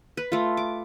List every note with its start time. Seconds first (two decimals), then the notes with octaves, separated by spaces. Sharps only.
0.17 B4
0.32 A3 F4
0.57 D6